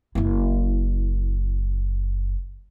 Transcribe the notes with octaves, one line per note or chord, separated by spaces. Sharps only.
F#1 E4